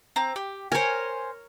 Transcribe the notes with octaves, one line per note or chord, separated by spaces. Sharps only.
C4 A#5
G4
A#4 C5 C#5 G#5